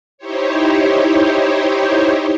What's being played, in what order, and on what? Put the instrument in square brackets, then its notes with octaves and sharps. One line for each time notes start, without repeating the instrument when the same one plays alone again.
[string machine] D#4 E4 G4 C5 C#5